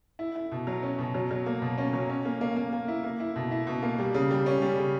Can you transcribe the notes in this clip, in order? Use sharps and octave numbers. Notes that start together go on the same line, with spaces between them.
E4
E4
B2
F#3
C#4
B2
F#3
F#3
A#3
B2
C#4
F#3
C#4
A#3
A#3
A#3
A#3
E4
A#3
E4
B2
E4
B2
A#3
G3
C#3
G3
C#4
G3
C#3